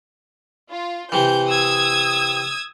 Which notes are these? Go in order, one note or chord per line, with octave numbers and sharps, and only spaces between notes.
F4
C3 E3 G6
D#6 E6 G#6